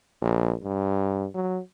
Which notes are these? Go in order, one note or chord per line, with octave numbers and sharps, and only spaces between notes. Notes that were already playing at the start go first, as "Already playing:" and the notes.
A#1
G2
F#3